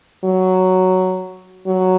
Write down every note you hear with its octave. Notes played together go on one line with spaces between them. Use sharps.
F#3
F#3